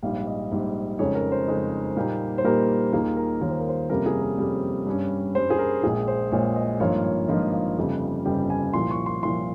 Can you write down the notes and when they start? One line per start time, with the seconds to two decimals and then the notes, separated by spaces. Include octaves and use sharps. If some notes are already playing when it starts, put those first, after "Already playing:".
0.03 A#1 G#2 G3 F5
0.27 D#5
0.51 A#1 G#2 G3
0.99 F2 C#3 G#3 D#4 C#5
1.15 A#4
1.32 C5
1.48 F2 C#3 G#3 D#4
1.96 A#2 G3 A#3 D#4 G4
2.38 C5
2.44 A#2 G3 A#3 D#4 G4 A#4
2.93 D#2 D#3 A#3 F4 G#4
3.17 A#4
3.41 D#2 D#3 A#3 F4 C#5
3.51 C5
3.60 A#4
3.69 C5
3.90 F2 C3 G3 A#3 C#4 A#4
4.06 G#4
4.22 A#4
4.38 F2 C3 G3 A#3 C#4
4.86 G2 G3 C#4
5.35 G2 G3 C#4 C5
5.50 G#4
5.59 A#4
5.83 A#1 A#2 G#3 G#4
6.08 C5
6.31 A#1 A#2 G#3 C#5
6.56 D#5
6.80 G#1 G2 F3 A#3 F4 C#5
7.04 C#5
7.28 G#1 G2 F3 A#3 F4 D#5
7.53 F5
7.77 G1 F2 C#3 G3
8.25 G1 F2 C#3 G3 G5
8.50 G#5
8.73 C2 A#2 F3 C6
8.91 C#6
9.06 C6
9.23 C2 A#2 F3 C6